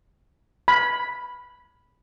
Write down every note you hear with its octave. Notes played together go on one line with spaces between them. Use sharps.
B5